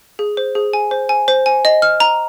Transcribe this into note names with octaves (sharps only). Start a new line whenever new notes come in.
G#4
C5
G#4
G#5
C5
G#5
C5
G#5
D#5
F6
A#5